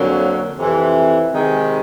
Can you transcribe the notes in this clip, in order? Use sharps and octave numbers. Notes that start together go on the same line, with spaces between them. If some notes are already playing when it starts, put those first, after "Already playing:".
Already playing: F2 D3 F#3 A#3 C#4
F2 C3 E3
C3 D#3 G#3